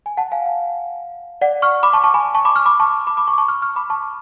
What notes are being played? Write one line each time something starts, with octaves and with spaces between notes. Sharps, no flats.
G#5
F#5 A5
F5 G#5
F5
D5 F#5
C#6 F6
B5 D6
A5 C#6
A5 C#6
G#5 B5
A5 C#6
B5 D6
C#6 F6
B5 D6
A5 C#6
B5 D6
B5 D6
A5 C#6
D6
A5 C#6
C#6 F6
C#6 F6
B5 D6
A5 C#6